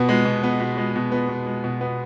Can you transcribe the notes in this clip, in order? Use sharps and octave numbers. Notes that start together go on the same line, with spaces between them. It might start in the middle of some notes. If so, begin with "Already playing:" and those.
Already playing: B2 B3
G#3
B2
B3
B2
G#3
B2
B3
B2
G#3
B2
B3